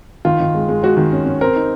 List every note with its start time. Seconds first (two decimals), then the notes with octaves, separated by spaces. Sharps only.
0.25 D#3 F4
0.40 D#3
0.54 G#3
0.69 G#3
0.83 G#3 F#4
0.97 D#3
1.12 C#4
1.26 C#4
1.41 C4 A#4
1.56 D#4